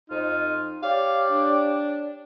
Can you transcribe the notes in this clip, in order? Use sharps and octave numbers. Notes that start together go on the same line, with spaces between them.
F2 D#4 F4
G4 C#5 D5 F5
D4